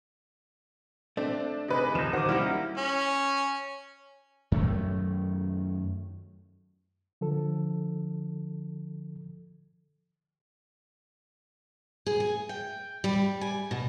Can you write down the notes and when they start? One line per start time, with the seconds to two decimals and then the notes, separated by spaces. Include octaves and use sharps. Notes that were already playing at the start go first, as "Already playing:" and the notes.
1.17 A3 C4 D4
1.68 C3 D#3 G#4 B4 D#5
1.95 D2 F3 D#4 E7
2.13 D#3 F#4 C5 D6
2.29 G3 A#3 C#4 D#4 E4 G4
2.77 C#4
4.52 F#2 D#3 A3
7.21 D3 F3 A4
12.06 G#4
12.20 G#5
12.49 G5
13.04 G3
13.41 G#5
13.71 B2